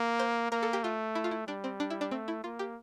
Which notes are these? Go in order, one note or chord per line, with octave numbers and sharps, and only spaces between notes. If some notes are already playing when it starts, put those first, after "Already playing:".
Already playing: A#3
C5
A#3 A#4
A4
G4
A3 F4
E4
F4
E4
G3 D4
C4
D4
E4
D4
A3 C4
E4
A#3 F4
G4